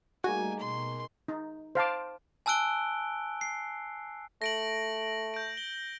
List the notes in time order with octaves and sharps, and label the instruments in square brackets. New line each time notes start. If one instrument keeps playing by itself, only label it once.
[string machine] G3 A3 [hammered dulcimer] A#3 D#4 G#4 [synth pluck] F#4 [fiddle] G#5
[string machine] B2 C#6 [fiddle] C6
[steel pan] D#4
C5 F5 A5 D6
[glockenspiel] G#5 A5 E6 F#6 D7 G7
C7
[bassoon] A3 [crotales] A#6 D7 F#7
[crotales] G6 D7
G7